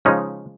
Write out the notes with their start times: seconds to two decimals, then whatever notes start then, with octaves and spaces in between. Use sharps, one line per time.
0.05 C#3 F3 G#3 C#4 D#4